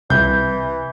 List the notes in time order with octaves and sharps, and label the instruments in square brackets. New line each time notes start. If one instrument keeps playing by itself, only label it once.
[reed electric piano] C2 [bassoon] E3 [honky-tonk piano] G6